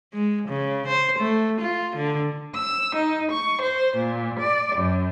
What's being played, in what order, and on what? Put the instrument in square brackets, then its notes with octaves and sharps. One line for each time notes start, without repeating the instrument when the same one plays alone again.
[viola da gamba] G#3
C#3
C5
A3
F4
D3
[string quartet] E6
D#4
C#6
C5
A#2
D5
F#2